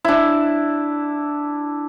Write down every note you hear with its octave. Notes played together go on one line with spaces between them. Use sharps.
D4 E4